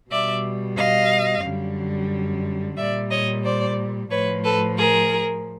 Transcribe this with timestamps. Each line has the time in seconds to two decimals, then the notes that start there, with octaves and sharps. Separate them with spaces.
0.10 B2 G3 D5 E5
0.77 D#5 F5
1.44 F#2 D3 G3
2.77 A#2 G3 D5 E5
3.10 C#5 D#5
3.44 C5 D5
4.10 A2 F3 B4 C#5
4.43 A4 B4
4.77 G#4 A#4